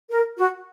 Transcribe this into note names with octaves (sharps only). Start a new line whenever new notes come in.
A#4
F#4